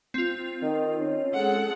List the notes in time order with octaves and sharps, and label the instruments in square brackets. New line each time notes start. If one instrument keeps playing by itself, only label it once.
[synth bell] C4 F4
[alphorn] D#3
C#4
[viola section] G#3 A4 F#5